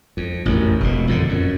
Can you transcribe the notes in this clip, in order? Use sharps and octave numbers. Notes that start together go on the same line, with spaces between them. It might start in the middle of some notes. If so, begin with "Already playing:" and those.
F2
A1 F#2
E1 B2
F2 A#2 D3
F#2